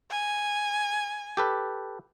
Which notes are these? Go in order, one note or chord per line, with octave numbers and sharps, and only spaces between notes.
G#5
G4 A4 B4